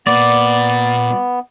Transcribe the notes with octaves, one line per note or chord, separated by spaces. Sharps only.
A#2 B3 D5